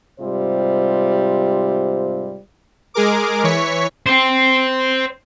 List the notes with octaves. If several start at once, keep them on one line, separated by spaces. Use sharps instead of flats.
G#2 C3 G3 F4 C5
G#3 G#4 A#4 D6
E3 C#5 C#6 B6
C5 G5